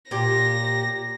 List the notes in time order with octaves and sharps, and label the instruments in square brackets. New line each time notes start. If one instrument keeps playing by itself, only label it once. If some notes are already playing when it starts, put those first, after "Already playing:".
[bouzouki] A#2 G4 [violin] A#6